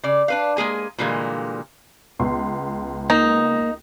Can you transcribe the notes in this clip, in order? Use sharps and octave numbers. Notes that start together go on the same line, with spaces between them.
C#3 D5
D4 B4 F5
G#3 A#3 G#4 G#5
A#2 D3 E3 G3 G#3 A#3
C#2 B3 C6
A#3 D#4